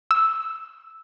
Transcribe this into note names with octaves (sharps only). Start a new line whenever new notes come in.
E6